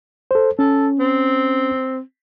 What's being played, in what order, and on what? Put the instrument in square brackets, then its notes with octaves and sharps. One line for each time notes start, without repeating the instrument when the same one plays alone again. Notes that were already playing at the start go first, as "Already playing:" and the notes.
[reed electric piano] A4 C5
[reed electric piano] C#4 [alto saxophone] A4
[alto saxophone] C4